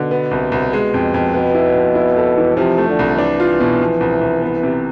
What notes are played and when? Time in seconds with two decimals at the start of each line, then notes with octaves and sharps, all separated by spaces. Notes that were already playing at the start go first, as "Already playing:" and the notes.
Already playing: B2 D3
0.11 B3
0.31 C2
0.52 C2
0.73 G#3
0.94 F2
1.14 F2
1.34 B2 B3
1.55 E4
1.75 F2
1.95 E4
2.17 A4
2.37 E3
2.57 C3 F3
2.78 A3
2.88 D3
2.99 C2
3.18 E3 D4
3.40 F4
3.60 B2
3.81 F3
4.00 C2
4.21 C2
4.42 B3
4.63 C3